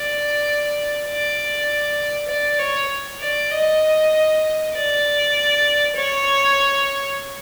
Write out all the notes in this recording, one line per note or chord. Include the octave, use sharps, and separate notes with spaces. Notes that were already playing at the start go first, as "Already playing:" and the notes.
Already playing: D5
D5
D5
C#5
D5
D#5
D5
C#5